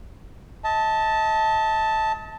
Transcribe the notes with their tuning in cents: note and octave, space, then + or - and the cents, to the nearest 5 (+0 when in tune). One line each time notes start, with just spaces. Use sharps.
D#5 +40 A5 +0